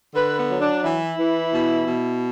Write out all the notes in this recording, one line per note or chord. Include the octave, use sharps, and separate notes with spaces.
D3 B4
B3
F#3
D4
E3 E4
E3
B2
B2